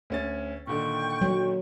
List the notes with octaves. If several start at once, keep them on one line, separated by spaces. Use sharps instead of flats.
D2 C#4 A6
A#2 D3 D#3 G5 C#6
F#3